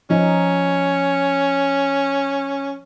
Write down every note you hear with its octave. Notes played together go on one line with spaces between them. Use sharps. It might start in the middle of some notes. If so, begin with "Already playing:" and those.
F3 C#4 D#4